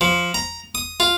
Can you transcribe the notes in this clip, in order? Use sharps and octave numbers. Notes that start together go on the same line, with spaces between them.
F3
A#5
D#6
F4